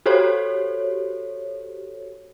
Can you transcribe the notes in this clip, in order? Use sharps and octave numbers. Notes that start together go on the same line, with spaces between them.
F#4 G4 A4 C5 C#5